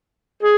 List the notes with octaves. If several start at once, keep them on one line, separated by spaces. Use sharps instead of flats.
G#4